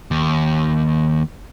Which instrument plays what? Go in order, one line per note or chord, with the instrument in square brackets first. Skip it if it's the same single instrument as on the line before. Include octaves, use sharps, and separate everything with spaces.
[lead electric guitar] D#2